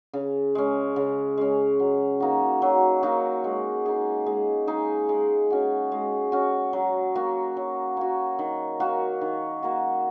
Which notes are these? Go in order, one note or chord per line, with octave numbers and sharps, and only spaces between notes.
C#3
G#3 C#4
C#3
G#3 C#4
F#3
A#3 D#4 F#4
F#3
A#3 D#4 F#4
G#3
D#4 G#4
G#3
D#4 G#4
G#3
C#4 F#4
G#3
C#4 F#4
F#3
A#3 F#4
F#3
A#3 F#4
D#3
A#3 F#4
D#3
A#3 F#4